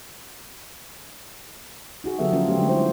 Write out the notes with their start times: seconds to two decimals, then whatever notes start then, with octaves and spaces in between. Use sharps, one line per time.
2.04 D#4 F#4 G#4
2.19 D3 F#3 B3 G4 A4 E5
2.32 F3 A#3 C#4 F4 A#4
2.45 G3 A3 C#4 F#4 G4
2.58 D3 G3 G#3 D4 F#4
2.69 E4 C5